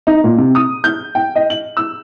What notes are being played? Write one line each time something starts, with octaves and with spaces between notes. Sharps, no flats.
D#4
A#2
C3
D#6
G6
G5
D#5
F#7
E6